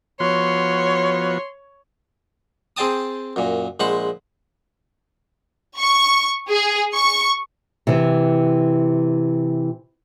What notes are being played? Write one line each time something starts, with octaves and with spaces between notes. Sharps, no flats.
F3 B3 F#4 C#5 C6
C4 G#4 C5 G5 A5 D#6
F#2 A#2
A#1 G#3 C5 F#5 B5 C#6
C#6
G#4
C#6
C3 E3